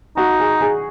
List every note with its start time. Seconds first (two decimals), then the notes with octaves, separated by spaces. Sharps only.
0.17 D#4 F#4
0.40 G#4
0.61 G#4